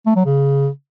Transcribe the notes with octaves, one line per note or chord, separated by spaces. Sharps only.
A3
F#3
C#3